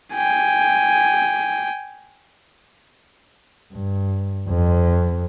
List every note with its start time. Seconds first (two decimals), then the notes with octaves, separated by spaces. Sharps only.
0.15 G5 G#5
3.73 G2
4.49 F2